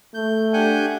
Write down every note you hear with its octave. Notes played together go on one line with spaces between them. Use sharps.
A3 G6
D4 G4 F#5 G#5 G6